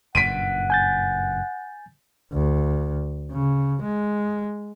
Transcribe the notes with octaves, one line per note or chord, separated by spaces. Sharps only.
F#1 G2 A#2 F#5 B6 D7 D#7
G#5 G6 A6
D2
C#3
G#3